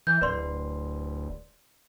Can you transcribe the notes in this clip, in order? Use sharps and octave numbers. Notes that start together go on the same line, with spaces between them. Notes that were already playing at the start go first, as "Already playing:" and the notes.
E3 G6
D1 B4 D5 C6